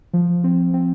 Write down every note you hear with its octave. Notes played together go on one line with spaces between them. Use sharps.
F3
C4
C4